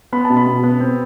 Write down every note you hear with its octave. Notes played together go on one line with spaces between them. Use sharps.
B3 B5
A5
B2
B5
B2
B3
C4